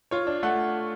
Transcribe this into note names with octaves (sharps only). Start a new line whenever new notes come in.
F4 C#5
D4
A3 F#5